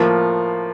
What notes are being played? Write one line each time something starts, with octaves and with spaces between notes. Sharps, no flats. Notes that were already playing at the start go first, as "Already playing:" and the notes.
Already playing: A2 F3 A#3